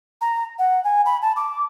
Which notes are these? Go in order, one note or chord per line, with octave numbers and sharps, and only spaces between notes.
A#5
F#5
G#5
B5
A5
D6